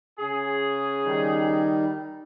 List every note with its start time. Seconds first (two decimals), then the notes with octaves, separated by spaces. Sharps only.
0.19 C#3 G#4
1.04 D#3 G3 D#4